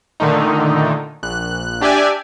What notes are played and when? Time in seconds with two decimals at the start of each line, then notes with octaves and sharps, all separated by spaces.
0.20 A#2 D3 D#3 A3 D#4
1.23 A#1 F#6
1.81 D4 G4 D5 E5 G#5